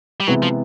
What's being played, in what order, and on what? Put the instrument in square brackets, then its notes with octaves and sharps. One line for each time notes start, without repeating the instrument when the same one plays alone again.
[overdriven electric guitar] G3
[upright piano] C3 E3 G#3 B3 E4 [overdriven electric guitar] F#3
[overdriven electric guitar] F3